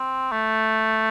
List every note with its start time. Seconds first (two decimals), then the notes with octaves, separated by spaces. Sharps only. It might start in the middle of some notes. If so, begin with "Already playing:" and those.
Already playing: C4
0.32 A3